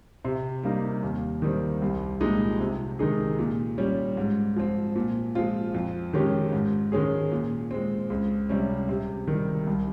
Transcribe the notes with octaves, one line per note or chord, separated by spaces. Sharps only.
C3
G3 A#3 D#4
D#2
D#3 G3 C4
C2
A#2 F3 G#3 D#4
C3
D#3 G#3 D#4 G#4
A#2
G3 C#4
G#2
F3 C4
A#2
F3 G#3 C4 F4
F2
D#3 G#3 C#4 G4
G#2
D#3 G#3 C#4 G#4
A#2
G#3 C4
C#2
C3 G3 C#4
C3
D#3 G3
C2